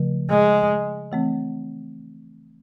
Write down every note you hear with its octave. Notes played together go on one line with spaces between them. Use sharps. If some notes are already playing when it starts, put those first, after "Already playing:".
Already playing: C#3 F3 A3
G#3
E3 A3 C4